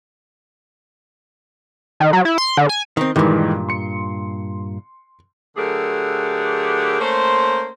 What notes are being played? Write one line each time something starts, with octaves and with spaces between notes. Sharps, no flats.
D#3
F#3
E4
C6
D3
G#5
D#3 C4
G2 A#2 D#3 E3 G#3
C6 C#7
D3 F#3 A3 G4 G#4 A#4
A3 A#3 C#4 C5